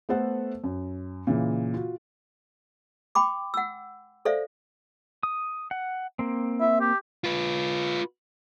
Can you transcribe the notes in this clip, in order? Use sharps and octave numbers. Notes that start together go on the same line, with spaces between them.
A3 B3 A4 C5 F#5
F#2
A#2 C#3 E3
F4 F#4
G5 B5 D6
F#5 E6
A4 C5 D5 E5 F5
D#6
F#5
A#3 C4
E5
G4
F4 B4